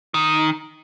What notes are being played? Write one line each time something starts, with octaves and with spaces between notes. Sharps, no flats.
D#3